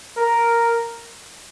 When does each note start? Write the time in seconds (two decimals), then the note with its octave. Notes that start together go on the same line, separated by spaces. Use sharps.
0.16 A#4